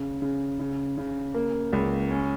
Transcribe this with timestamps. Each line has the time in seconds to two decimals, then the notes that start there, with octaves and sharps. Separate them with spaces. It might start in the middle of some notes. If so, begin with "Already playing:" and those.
Already playing: C#3
0.22 C#3
0.60 C#3
0.98 C#3
1.34 A#3
1.73 C#2
2.11 C#4